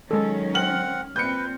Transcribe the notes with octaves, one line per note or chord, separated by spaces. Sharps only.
D#3 F#3 G#3 C#4 A4
C4 F#5 F6 F#7
A#2 C4 B4 G6 C#7